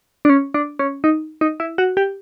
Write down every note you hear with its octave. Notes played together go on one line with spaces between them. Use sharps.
D4
C#4
D4
C#4
D#4
D#4
E4
F#4
G4